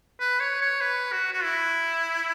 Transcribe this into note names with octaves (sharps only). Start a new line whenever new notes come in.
B4
C#5
C#5
B4
F#4
F#4
E4